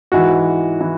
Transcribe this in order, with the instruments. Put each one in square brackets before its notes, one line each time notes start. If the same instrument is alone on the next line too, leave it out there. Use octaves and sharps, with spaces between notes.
[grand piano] G#2 E3 F#4
E3